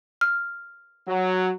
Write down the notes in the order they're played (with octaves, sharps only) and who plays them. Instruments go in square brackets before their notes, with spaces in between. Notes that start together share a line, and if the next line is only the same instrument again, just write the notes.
[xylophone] F6
[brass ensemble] F#3